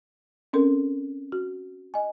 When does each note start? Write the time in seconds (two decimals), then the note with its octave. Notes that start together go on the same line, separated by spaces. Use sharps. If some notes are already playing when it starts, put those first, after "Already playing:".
0.53 C4 C#4 A4 A#4
1.32 F#4
1.94 D#5 G#5